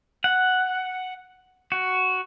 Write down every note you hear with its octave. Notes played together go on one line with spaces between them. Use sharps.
F#5
F#4